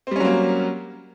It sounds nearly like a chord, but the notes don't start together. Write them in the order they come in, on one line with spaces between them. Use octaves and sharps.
C4 G3 C#4 F#3 A#3